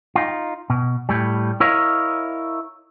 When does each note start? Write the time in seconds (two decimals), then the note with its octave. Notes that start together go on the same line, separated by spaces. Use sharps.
0.16 D#4 F4
0.70 B2
1.09 A2 G3
1.60 E4 A#4 C#5 D#5 F5